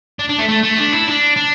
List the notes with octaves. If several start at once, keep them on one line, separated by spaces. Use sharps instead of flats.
D4
D4
A3
A3
A3
D4
E4
D4
D4